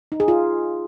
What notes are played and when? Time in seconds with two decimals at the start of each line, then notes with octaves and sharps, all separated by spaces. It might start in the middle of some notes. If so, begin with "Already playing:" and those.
0.12 D#4
0.20 G#4
0.28 F4